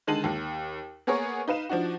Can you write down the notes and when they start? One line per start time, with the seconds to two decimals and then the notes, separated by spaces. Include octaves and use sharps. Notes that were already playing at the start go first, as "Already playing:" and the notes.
0.07 D3 D#3 G#3 A5 D#7 F#7
0.24 D#2
1.07 A#3 B3 G#4 A#4 C#5
1.48 D#4 B4 F5 E7
1.69 F3 D4 D#4 F#4